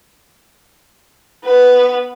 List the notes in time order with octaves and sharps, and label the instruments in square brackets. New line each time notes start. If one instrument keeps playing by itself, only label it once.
[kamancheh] B3 B4